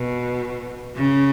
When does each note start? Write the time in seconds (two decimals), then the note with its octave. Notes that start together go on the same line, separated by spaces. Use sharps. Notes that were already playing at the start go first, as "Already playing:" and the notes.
Already playing: B2
0.96 C#3